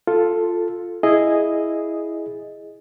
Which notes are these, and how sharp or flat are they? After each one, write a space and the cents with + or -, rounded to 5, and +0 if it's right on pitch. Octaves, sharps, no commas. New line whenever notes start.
F4 +5 A4 +0
E4 +0 G#4 +0 D#5 -5